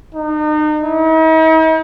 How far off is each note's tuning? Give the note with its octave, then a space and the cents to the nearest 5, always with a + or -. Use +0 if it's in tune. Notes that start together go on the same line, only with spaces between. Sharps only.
D#4 -35
D#4 +45